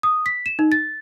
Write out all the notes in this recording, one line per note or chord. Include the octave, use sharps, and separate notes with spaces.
D#6
B6
E7
D#4
A6